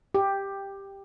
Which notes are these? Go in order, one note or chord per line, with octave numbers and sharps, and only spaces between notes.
G4